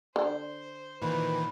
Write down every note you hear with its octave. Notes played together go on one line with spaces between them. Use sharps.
D3 C5
A#2 D#3 E3 B4